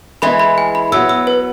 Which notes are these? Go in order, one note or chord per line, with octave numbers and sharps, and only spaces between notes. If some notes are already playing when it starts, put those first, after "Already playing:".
E3 G#3 B5
B5
G#5
B5
F#3 B3 E6
E6
B4